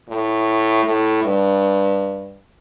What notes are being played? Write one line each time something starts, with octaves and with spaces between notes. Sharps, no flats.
A2
A2
G2